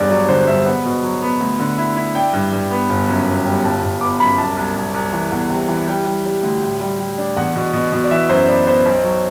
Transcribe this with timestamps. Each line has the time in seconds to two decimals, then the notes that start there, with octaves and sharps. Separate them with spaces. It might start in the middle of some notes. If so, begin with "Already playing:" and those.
Already playing: E1 G2 D5
0.10 F#3 D5
0.29 D3 C5
0.47 G2 E5
0.66 B3 F#5
0.85 B2
1.03 F#3
1.22 B3
1.40 D2
1.59 D3
1.78 E4
1.96 E4
2.15 D4 G5
2.33 G2
2.52 G2
2.71 B3
2.89 G1
3.08 F#2
3.27 F#2
3.46 G3
3.64 G1 A5
3.82 G1
4.01 B3 D6
4.20 F#2 B5
4.38 C2 A5
4.57 C2
4.76 C2
4.94 C2
5.13 E3
5.32 E2
5.50 C3
5.68 E3
5.88 G3 G5
6.06 G3
6.25 G3
6.43 D2
6.62 A2
6.80 G3
6.99 G3
7.18 D4
7.37 E2 F#5
7.56 B2
7.73 B2
7.92 B2
8.04 D5
8.11 E3 E5
8.29 F#2 C5
8.48 B3 D5
8.67 B3 C5
8.86 B1
9.04 F#3